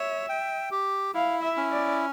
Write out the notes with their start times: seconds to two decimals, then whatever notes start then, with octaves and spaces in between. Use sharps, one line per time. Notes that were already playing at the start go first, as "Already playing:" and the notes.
Already playing: C#5 E5
0.29 G5
0.71 G4
1.14 E4 F5
1.42 E5
1.57 C#4
1.71 D5